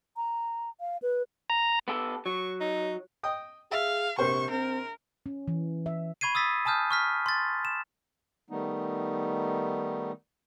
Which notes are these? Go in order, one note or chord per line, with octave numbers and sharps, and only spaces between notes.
A#5
F5
B4
A#5
B3 G4 A4
F#3 C#6
D#4
D#5 G5 D#6
G#4 E5 F5
A#1 C3 A#3 C5 C#6
C4 A#4
C#4
E3
E5
B5 C#6 G#6 C7 D#7
D#6 E6 A6 B6
G#5 A5 D#6 F6 G6
C#6 F6 B6
C6 A6
E7
D#3 G3 A3 B3 D#4